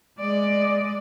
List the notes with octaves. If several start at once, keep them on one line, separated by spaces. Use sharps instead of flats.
G#3 D5